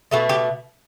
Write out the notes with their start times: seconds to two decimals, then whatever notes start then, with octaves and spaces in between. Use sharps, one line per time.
0.11 B2 A3 A4
0.29 G4